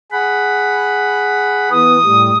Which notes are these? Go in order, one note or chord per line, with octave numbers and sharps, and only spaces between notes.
G#4 F#5 B5
E3 B3 D#6
A2 G3